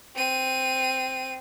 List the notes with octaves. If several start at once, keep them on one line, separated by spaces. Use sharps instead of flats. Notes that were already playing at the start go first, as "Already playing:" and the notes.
C4 D#7